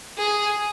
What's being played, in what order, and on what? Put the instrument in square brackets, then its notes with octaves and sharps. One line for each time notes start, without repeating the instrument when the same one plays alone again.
[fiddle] G#4